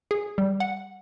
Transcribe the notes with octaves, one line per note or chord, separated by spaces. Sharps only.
G#4
G3
F#5